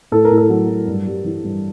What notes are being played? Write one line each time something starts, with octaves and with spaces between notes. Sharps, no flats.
A2 A4
A#4
A2
A4
F#3
F#3
G2
G3
E3
G2